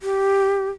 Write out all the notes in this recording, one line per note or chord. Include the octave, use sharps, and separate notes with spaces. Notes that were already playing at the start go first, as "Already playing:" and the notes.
G4